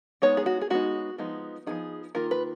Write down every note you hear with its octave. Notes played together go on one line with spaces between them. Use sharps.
G#3 B3 D#4 C#5
G#4
F#4
G#4
G#3 B3 D#4 F#4
F3 G#3 B3 D#4
F3 G#3 B3 D#4 G#4
D#3 A#3 F4 A#4
B4